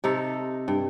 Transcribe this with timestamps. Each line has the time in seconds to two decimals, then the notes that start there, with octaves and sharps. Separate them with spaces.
0.04 C3 D#4 A4
0.68 G2